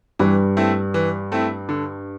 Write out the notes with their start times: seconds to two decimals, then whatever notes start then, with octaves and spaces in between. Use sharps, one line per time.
0.19 G2 E3 G3
0.57 A3 C4 E4
0.94 E3
1.32 A3 C4 E4
1.69 D3